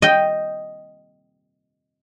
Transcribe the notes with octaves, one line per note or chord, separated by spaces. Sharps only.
D#5 G5